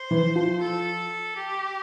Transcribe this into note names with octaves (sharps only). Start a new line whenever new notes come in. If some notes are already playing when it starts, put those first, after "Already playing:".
Already playing: C5
E3
F3
A4
G4